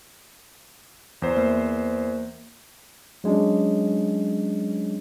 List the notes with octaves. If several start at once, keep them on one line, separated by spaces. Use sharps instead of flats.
E2 C5
A#3
F#3 G#3 C#4 D4